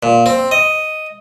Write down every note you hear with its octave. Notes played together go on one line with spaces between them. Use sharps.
A#2
C4
D#5